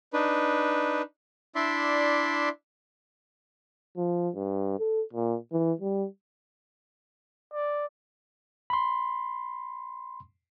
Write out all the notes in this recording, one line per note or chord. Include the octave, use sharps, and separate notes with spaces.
D4 D#4 B4
D4 E4 D5 E5 C6
F3
G2
A4
A#2
E3
G3
D5
B5 C6